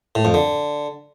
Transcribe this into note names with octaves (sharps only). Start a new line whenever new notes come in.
A2
F2
D3